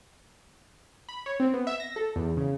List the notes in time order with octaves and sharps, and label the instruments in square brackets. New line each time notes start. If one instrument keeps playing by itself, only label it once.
[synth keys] B5
C#5
C4
B3
E5
A#6
A4
E2
C#3